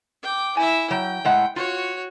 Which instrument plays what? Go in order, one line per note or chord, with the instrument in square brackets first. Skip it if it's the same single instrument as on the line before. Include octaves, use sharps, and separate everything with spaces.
[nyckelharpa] G5 D6
[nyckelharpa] E4 E5 [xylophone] G#5
[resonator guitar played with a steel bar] F#3 [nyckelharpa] G5
[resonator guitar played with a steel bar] A2 G#3 F#5
[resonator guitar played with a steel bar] F4 [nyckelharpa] F#4 C#5